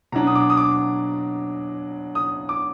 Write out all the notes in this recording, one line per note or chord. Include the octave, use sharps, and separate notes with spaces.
B2 F#3 D4 A#5
D#6
D6
D#6
D6
D#6
D6